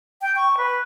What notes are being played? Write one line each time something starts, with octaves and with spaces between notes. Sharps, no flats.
G5
C#6
B4